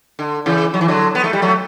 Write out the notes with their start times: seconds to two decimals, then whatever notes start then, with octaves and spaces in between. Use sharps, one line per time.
0.19 D3
0.46 C#3 E3
0.74 F#3
0.81 E3
0.88 D3 F#3
1.15 B3
1.24 A3
1.33 G3
1.42 F#3 A3